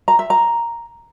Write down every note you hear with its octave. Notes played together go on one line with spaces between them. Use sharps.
A#5
E5
A#5